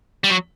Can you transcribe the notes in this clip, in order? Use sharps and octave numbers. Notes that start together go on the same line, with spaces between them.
G3
F#3